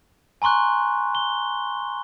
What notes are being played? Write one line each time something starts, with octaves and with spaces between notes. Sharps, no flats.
G#5 A#5 C6 C#6 F#6
G7